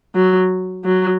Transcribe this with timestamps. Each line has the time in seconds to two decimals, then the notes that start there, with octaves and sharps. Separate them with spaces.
0.15 F#3
0.84 F#3